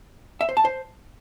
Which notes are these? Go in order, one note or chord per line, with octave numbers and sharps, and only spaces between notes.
E5
C5
A5
C5